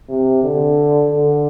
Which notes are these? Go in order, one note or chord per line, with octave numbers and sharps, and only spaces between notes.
C3
D3
D3